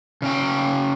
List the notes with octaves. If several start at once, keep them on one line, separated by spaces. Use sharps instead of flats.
C#3 C#4 G5